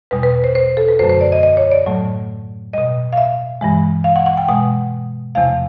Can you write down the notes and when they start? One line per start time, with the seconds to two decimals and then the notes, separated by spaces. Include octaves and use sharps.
0.11 E2 B2 G3 B4
0.23 B4
0.44 C5
0.55 C5
0.77 A4
0.88 B4
0.99 F#2 D3 F#3 A3 C5
1.09 C5
1.21 D5
1.32 D#5
1.43 D#5
1.57 C#5
1.72 D5
1.86 A2 F#3 A3
2.73 B2 G3 D#5
3.13 F5
3.17 E5
3.61 G2 E3 G#3
4.04 F5
4.16 F#5
4.26 F#5
4.37 G5
4.48 B2 G#3 F#5
5.35 E2 C3 F3 A3 F5